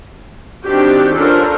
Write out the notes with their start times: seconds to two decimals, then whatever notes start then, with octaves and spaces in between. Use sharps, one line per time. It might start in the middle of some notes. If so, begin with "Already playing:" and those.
0.64 D#3 C4 D4 F#4 G4 G5
1.14 C#4 D4 F4 A4 A#4 C5